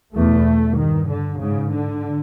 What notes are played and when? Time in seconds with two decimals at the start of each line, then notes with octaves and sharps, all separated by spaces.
0.16 E2 B2 A3
0.77 G2 D#3
1.09 D3
1.40 G#2 C#3
1.72 D3